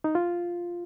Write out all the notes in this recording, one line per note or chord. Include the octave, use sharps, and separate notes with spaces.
D#4
F4